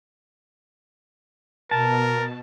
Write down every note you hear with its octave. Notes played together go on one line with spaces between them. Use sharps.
B2 A#4 A5